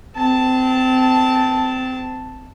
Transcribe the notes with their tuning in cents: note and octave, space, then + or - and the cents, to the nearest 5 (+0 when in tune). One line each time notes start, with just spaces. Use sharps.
C4 -25 A5 +0